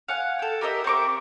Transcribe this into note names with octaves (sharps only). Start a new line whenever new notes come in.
F5 F#5 G#5
A4 G5
G4 A#4 D#5 E5
C4 A#4 C#6 D6